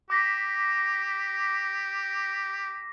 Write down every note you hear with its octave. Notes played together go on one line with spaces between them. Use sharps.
G4 D6 A#6 B6